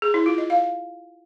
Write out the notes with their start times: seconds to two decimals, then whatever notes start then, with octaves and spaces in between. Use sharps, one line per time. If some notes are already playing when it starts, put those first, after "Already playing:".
0.02 G#4
0.14 E4
0.26 F4
0.38 D#5
0.50 F5